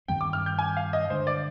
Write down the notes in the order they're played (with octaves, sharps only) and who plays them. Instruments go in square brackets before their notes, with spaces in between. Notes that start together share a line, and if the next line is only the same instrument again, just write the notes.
[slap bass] G2 D#3 G3 C4 [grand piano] G5
[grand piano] D6
F6
G6
G#5
F5
D#5
[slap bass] D3 G#3 D4 [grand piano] C5
[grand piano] D5